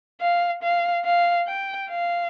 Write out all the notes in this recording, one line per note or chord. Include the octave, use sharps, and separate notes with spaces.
F5
F5
F5
G5
F5